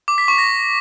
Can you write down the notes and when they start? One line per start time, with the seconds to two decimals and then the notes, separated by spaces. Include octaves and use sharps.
0.08 D6
0.18 B6
0.28 C#6
0.38 A#6